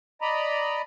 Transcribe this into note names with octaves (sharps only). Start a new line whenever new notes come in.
D5 D#5 A#5 B5